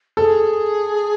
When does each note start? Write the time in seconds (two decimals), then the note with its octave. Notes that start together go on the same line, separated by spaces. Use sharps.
0.17 G#4 A4